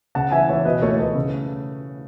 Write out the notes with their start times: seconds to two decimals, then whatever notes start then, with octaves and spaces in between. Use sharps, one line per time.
0.15 C#3 F#5 A5
0.32 E3 E5 G#5
0.49 E3 C#5 E5
0.65 B2 B4 D#5
0.82 A3 A4 C#5
0.99 A3 B4 D#5
1.15 C#3